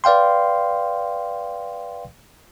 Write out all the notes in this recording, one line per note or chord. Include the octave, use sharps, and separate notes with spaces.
B4 D5 F5 G5 C6